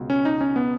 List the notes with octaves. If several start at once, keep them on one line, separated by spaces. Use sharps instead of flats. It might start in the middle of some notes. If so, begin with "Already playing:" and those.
Already playing: C#2 B2
C#4
D#4
C#4
B3